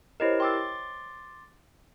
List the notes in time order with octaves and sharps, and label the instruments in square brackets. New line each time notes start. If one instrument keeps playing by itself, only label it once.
[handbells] E4 G4 A#4 [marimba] C5 C#5 D#5
[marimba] G5 E6 [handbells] C6 D6 A6